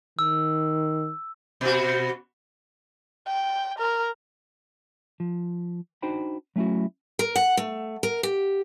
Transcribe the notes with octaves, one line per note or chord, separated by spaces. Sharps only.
D#3 E6
B2 F#4
G5
A#4
F3
D4 D#4 F#4 C5 G5 B5
F#3 A3 C#4 E4 F#4
A#4
F#5
A3
A#4
G4